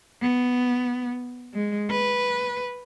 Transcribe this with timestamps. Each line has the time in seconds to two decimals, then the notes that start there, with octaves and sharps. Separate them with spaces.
0.22 B3
1.54 G#3
1.91 B4